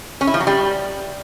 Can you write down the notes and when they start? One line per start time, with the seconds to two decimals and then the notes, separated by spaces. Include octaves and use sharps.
0.21 C#4
0.27 E4
0.34 F3
0.40 F#3
0.47 G3